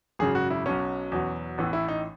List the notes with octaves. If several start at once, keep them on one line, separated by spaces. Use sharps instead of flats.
G#1 F#2 C#3 G#4
F#4
E4
B1 B2 F#3 C#4
E2 B2 F#3
A1 A2 E3 B3
E4
D#4